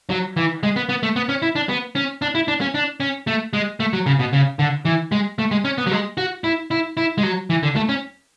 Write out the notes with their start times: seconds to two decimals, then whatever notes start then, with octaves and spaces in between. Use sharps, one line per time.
0.10 F#3
0.37 E3
0.63 G#3
0.76 B3
0.89 B3
1.03 A3
1.16 B3
1.29 C#4
1.42 E4
1.55 D4
1.69 B3
1.95 C#4
2.22 D4
2.35 E4
2.48 D4
2.61 C#4
2.74 D4
3.00 C#4
3.27 A3
3.53 G#3
3.80 A3
3.93 F#3
4.06 C#3
4.19 B2
4.33 C#3
4.59 D3
4.85 E3
5.12 G#3
5.39 A3
5.51 G#3
5.65 C#4
5.78 B3
5.87 F#3
5.91 G#3
6.17 F#4
6.44 E4
6.71 E4
6.97 E4
7.18 G#3
7.23 F#3
7.50 E3
7.63 D3
7.76 A3
7.89 C#4